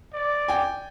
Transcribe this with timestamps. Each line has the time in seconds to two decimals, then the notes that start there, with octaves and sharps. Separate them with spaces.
0.13 D5
0.48 G5 G#5